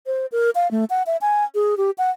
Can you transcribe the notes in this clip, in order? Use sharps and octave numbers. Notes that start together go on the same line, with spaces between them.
C5
A#4
F5
A3
F#5
E5
G#5
G#4
G4
F#5